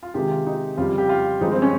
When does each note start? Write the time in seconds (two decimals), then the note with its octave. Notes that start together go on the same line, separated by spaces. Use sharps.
0.03 F4
0.14 C3 D#3 G#3 G4
0.31 F4
0.46 D#4
0.77 F2 C#3 G3 F4
0.89 F4
0.98 G4
1.09 F4
1.41 G2 F3 G#3 D#4
1.52 C4
1.62 C#4